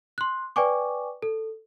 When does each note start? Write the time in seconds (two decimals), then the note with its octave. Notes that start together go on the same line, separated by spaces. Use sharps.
0.18 C6 F#6
0.56 B4 D5 G5 G#5 C#6 D6
1.22 A4